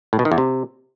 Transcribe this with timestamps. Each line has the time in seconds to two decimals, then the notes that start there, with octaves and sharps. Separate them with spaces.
0.13 A2
0.19 B2
0.25 D#3
0.32 E2
0.38 C3